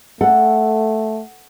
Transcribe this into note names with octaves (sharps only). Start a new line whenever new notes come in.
A3 A4 F#5